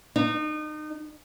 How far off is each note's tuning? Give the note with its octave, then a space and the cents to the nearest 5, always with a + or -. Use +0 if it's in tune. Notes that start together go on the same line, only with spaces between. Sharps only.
D#4 -30